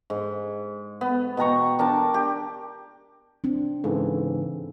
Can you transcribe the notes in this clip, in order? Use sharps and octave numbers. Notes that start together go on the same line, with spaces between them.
G#2
B3
B2 G5 A#5 C#6
D4 A#4 G5 A5
G4
C4 D4
G#2 C#3 E3 A4